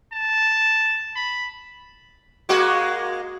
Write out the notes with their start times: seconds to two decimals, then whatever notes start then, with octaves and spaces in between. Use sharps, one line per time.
0.13 A5
1.15 B5
2.49 G#3 A#3 F#4